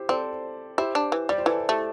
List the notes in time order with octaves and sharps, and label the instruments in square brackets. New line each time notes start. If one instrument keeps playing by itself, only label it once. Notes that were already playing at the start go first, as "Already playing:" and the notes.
Already playing: [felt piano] E4 G4 C5
[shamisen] C4 [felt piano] A4 D5
[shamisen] E4 [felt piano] G4 C5
[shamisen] D4
E3
[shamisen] G3 [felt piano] D5
[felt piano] C5
[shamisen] E3 [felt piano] E4 A4
[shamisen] A3 [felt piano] G4